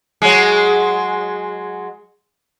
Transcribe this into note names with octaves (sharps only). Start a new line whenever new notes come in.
F#3 G#3